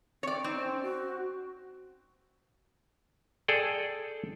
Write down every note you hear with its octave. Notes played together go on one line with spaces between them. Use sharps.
C4 C#5 D5
C4 D#4
C#4
F#4
G#4 A4 D5 G5